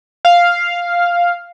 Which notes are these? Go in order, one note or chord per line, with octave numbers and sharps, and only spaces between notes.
F5